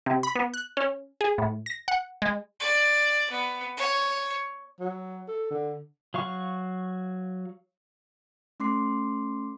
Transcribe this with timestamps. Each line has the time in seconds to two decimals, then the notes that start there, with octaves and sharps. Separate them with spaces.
0.06 C3
0.23 B5
0.35 B3
0.54 F#6
0.77 C#4
1.21 G#4
1.38 A2
1.66 A#6
1.88 F#5
2.22 G#3
2.60 D5
3.31 B3
3.77 C#5
4.80 F#3
5.28 A4
5.50 D3
6.14 F#3 F5 C#6
8.60 A3 C#4 C6 D6 C7